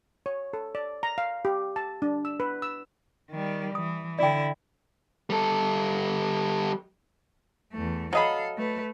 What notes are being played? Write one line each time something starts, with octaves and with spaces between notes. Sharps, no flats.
C#5
A4
D5
A#5
F5
G4
A5
D4
E6
B4
E6
D#3 G3
E3 D#6
D3 E4 D5 G5
G3 A4
E2 A3
F#3 A4 D#5 F5 B5
A3 B4